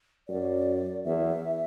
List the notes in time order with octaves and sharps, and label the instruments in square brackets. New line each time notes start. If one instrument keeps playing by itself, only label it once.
[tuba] F#2 [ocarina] D5
[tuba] E2 [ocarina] E5